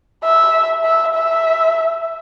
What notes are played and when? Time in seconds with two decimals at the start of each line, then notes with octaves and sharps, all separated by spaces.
0.24 E5
0.84 E5
1.15 E5